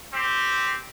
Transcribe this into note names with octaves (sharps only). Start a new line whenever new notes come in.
C4 G4